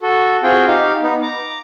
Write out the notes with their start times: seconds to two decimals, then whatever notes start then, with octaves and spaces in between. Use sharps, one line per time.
0.02 F#4 A4
0.43 C4 F4 F#4 G#4 G5
0.67 D#4 G4 F5
1.03 B3 D#4
1.22 A#5 D6